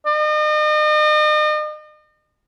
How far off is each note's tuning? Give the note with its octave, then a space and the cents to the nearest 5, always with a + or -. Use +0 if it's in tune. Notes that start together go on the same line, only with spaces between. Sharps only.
D#5 -40